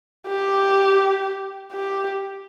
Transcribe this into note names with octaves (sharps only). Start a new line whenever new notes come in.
G4
G4